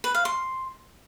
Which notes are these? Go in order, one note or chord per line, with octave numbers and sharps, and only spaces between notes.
B4
F5
C6